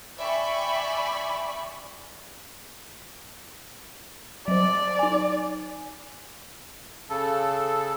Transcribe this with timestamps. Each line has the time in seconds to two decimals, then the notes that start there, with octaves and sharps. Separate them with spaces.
0.20 D5 E5 G5 G#5 B5 C#6
4.48 F#3 C5 D5
4.99 D#4 G#5
7.10 C#3 A4